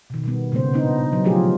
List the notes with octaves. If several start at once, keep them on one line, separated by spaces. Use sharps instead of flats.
B2 D#3
B2 G3 B3
A#2 C#3 G#3 B3 C5
B3 D4 D#4
F#3
D3 F3 A3 F4 G4 G#4